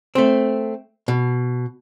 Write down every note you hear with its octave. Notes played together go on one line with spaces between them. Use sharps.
A3 C4
B2